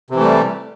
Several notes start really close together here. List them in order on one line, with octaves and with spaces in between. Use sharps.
C3 E3 A3 G3